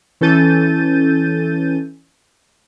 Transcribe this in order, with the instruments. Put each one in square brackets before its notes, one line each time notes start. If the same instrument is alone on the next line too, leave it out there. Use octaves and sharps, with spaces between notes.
[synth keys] E3 C#4 A4 G6 A6 D#7